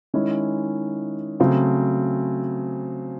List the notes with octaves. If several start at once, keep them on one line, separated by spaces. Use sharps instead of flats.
D#3 G#3 C#4 E4
C#3 F#3 A3 C4